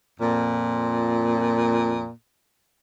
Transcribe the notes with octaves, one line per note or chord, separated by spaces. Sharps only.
F2 A#2